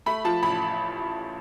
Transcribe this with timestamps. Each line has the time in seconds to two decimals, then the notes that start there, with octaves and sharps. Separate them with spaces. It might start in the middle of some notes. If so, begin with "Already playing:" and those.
0.06 A3 B5
0.24 F3 A5
0.42 A1 B5